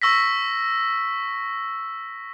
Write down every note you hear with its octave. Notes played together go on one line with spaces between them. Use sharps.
C#6 E6 A#6 B6